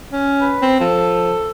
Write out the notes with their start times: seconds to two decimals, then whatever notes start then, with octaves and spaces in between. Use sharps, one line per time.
0.12 C#4
0.40 B4
0.62 C4
0.80 F3 A4